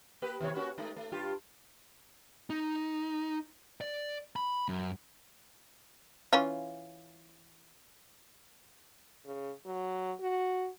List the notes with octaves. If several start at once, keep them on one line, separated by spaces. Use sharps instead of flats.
A#3 G4 B4
D#2 C3 C#5
A#3 C#4 F#4
G#3 A3 D#4
A3
G2 F4 G4
D#4
D5
B5
F#2
E3 C#4 F4
C#3
F#3
F#4